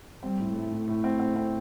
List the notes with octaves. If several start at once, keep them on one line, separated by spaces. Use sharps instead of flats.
G3 C4
A2
A2 A3
A2
A2
C4
C4
C4